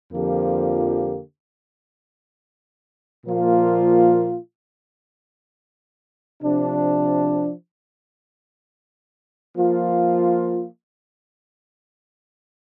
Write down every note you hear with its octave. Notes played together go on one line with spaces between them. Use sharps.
F2 D3 F3 A#3 G4
A#2 F3 A#3 F4
C3 F3 D4
F3 A#3 F4